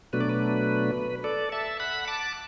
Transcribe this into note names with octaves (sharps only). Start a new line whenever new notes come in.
B2 F#3 A3 D4 B4
D5
B4
A4 D5
E5 A5
F#5 B5
A5 D6